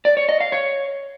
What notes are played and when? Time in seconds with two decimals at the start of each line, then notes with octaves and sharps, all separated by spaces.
0.05 D5
0.17 C#5
0.29 D#5
0.40 F5
0.52 C#5